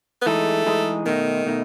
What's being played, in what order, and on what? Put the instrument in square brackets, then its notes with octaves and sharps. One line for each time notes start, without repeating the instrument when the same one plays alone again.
[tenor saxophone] B3
[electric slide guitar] E3 G#3 D#4 G#4 [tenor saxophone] A3
[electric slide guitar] E3 G#3 D#4 G#4
[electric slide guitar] B2 A3 D#4 [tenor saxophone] D#3
[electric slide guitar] B2 A3 D#4